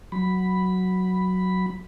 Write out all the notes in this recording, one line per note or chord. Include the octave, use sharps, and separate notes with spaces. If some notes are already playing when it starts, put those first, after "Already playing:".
F#3 B5